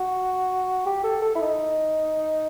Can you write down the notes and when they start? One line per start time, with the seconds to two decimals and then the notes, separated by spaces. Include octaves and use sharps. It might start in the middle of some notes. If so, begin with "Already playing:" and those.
Already playing: F#4
0.86 G4
1.04 A4
1.22 A4
1.35 E4
1.41 D#4